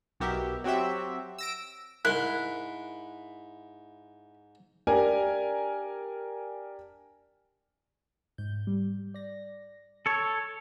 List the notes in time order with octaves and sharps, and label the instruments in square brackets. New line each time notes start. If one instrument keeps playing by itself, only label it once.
[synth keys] B1 B2 B3 G4 A#4 E5
F#3 C4 F#4 G4 E5
E6 A#6 D7
[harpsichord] G#2 C6 [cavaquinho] E4 [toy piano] A#4 [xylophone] F#6
[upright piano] D4 G4 A#4 G#5
[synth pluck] G#2 G6
G3
D5 A#6
[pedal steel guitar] A4 C#5